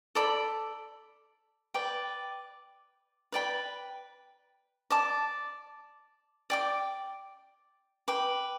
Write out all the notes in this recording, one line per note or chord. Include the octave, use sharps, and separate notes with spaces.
A4 D5 B5
B4 D5 G5
B4 D5 G5 B5
D5 A5 D6
D5 G5 D6
B4 G5 D6